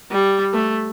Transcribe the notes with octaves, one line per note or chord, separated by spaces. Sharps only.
G3
A3